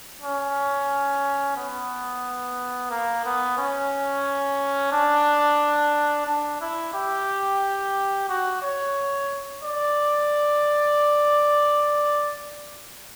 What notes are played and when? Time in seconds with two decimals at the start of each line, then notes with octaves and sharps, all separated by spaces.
0.21 C#4
1.56 B3
2.91 A#3
3.25 B3
3.58 C#4
4.92 D4
6.27 D4
6.61 E4
6.94 G4
8.29 F#4
8.62 C#5
9.63 D5